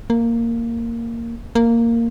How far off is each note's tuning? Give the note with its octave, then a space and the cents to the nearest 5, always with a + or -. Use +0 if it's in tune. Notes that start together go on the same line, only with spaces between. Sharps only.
A#3 -10
A#3 -10